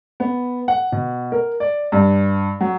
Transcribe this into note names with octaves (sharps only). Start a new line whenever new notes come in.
B3
F#5
B2
A#4
D5
G2
F#3